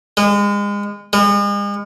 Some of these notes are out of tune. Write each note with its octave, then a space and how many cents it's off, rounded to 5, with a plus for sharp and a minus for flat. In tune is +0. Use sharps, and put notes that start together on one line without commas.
G#3 -30
G#3 -40